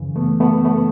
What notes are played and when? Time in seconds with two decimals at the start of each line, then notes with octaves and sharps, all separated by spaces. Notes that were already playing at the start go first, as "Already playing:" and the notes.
Already playing: F#2 C#3 E3
0.16 A3 B3
0.40 A3 B3
0.65 A3 B3